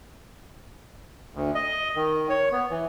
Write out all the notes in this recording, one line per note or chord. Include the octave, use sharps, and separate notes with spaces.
D2
D#5
D#3
C#5
B3
E3